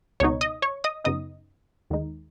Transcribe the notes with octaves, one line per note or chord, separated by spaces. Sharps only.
C#2 B2 B3 D#4 C#5 C#6
D#5 D#6
C#5 C#6
D#5 D#6
F#2 C#3 B3 D#4 D#5 D#6
D#2 D#3 G#3 D#4